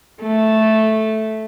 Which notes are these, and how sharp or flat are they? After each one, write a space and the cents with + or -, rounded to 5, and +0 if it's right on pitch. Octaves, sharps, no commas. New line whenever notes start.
A3 -5